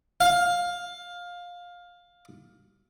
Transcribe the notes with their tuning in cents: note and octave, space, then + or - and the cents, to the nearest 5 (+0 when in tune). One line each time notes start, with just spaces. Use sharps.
F5 +15